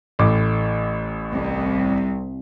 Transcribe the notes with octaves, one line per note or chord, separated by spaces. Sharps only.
A1 A2 D6
C2